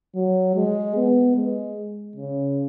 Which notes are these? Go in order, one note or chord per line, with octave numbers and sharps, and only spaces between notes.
F#3
G#3
B3
G#3
C#3